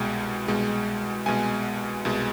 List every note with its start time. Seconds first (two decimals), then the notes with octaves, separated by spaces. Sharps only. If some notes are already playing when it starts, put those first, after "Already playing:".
Already playing: C2 B2 G#3 G5
0.48 C2 B2 G#3
1.26 C2 B2 G#3 G#5
2.05 C2 B2 G#3